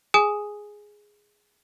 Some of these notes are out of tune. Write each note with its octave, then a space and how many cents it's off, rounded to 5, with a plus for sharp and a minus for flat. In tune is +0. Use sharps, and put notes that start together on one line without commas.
G#4 +0 G#5 +0 D#6 +0